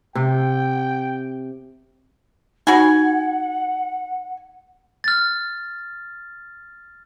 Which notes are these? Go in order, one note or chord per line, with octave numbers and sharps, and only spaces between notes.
C3 G5
D#4 F#4 F#5 G#5 B5
F6 A6